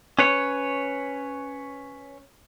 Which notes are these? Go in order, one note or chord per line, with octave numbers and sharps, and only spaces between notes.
C#4 B4 C#5